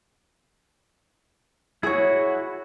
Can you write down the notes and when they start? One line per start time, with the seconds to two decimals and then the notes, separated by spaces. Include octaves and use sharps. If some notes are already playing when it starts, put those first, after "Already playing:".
1.83 E4 F#4 G#4 C#5